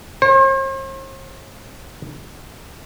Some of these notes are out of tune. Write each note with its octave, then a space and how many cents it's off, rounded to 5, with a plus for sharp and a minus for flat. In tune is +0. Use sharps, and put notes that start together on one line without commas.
C5 +45